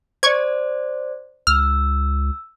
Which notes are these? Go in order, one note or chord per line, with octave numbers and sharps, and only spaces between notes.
C5 D5 C#6 G#6
C#2 E6 F6